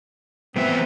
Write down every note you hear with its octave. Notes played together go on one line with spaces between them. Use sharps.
F2 E3 B3 C4 E5